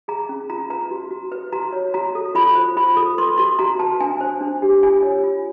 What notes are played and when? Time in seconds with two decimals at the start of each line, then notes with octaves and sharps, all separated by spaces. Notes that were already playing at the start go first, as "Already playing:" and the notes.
0.08 G#4 A#5
0.29 C#4
0.50 F4 A#5
0.70 B4 A#5
0.91 F#4
1.11 F#4
1.32 B4
1.52 F#4 A#5
1.73 C#5
1.94 F#4 A#5
2.15 A4
2.35 F4 B5
2.55 C5
2.77 F4 B5
2.96 A4
3.18 B4 C6
3.38 F#4 C6
3.59 F#4 A#5
3.79 B4 A5
4.00 D4 G#5
4.21 C5
4.41 D4
4.62 G4
4.83 F4 G#5
5.03 C#5
5.24 F4